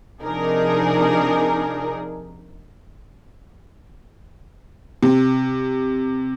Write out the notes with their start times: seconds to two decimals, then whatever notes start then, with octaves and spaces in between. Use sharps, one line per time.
0.23 C3 F3 D4 D#4 G#4 A#4
5.03 C3